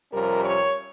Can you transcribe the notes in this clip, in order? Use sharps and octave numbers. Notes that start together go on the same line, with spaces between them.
F2 C3 G3 C#4 A#4
C#5